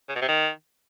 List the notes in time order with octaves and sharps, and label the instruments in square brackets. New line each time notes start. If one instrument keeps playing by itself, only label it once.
[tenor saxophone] C#3
B2
C3
D#3